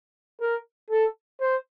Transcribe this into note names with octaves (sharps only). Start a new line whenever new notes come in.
A#4
A4
C5